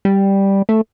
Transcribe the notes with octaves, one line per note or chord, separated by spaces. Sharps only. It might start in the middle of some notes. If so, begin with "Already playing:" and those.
G3
A3